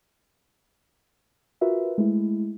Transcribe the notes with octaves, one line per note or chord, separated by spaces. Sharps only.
F4 F#4 A#4 B4 E5
G#3 A3 E4